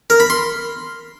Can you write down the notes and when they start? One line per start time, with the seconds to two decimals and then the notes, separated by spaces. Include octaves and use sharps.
0.10 A#4
0.20 B5
0.30 C6